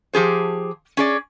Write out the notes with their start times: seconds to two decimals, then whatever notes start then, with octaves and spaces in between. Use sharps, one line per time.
0.13 F3 G4 G#4 C5
0.97 C#4 G#4 D5